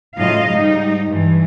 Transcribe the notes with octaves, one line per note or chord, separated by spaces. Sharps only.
A2 C#3 F#3 F4 D#5 F5
G#2 G3 D#4
G2 E3